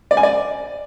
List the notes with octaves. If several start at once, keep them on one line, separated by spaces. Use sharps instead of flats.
D5
G#5
D5